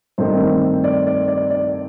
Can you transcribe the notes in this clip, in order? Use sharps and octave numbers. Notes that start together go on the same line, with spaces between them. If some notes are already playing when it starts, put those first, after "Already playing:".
G2 D#3 A3 C4 C5
D5
D5
D5
D5